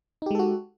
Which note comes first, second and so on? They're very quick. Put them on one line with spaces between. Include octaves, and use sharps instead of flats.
D#4 G4 G#3 A4 F#4